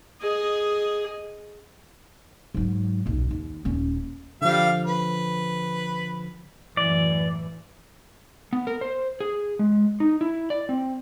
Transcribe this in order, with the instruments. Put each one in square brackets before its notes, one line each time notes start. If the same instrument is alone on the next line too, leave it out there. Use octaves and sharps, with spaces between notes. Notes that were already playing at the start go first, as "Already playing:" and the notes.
[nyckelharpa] G#4 D#5
[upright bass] G#2 F#3
D#1 B1
D#2
D#1 C#4
[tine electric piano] D3 F3 [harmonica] G3 F5
[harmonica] B4
[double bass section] F#2 A2 E3 [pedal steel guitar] D5
[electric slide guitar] B3
A#4
C5
G#4
G#3
D#4
E4
D5
C4